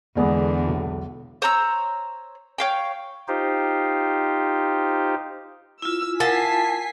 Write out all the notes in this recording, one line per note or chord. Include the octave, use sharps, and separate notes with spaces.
E2 D3 G#3 B3 D5
B1
C5 C#5 A#5 E6
C#5 F5 G5
D#4 F4 G4 C5
E4 F4 E6
A#4 F5 F#5 G#5 A5 B6 C7